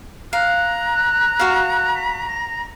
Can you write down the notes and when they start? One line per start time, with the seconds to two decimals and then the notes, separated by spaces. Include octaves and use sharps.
0.33 F5 A#5 F#6
1.39 F#4 F5
1.94 B6
2.26 A#6